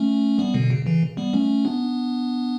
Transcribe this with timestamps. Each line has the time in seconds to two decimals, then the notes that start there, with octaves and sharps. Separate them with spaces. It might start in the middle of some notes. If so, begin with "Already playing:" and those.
Already playing: A3 C#4
0.38 G3 B3
0.54 B2 D3
0.70 C#3
0.85 C#3 E3
1.17 G3 B3
1.33 A3 C#4
1.65 B3 D4